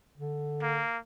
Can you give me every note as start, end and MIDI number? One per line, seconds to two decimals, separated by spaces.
0.17 0.83 50
0.62 0.98 58